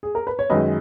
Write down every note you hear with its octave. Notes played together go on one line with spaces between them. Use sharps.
G#4
A#4
B4
C#5
F#2 D#3 G#3 B4 D#5